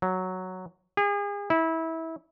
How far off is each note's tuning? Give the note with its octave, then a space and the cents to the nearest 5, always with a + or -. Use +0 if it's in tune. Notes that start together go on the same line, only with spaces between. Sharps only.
F#3 +0
G#4 -40
E4 -25